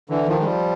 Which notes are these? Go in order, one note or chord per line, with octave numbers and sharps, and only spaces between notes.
D3 E3
D#3 F3
G#3
F3 G3